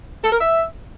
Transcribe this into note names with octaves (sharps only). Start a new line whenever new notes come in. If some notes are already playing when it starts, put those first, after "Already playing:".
A4
A#4
E5